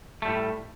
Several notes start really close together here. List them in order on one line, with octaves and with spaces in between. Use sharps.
A3 G3 A2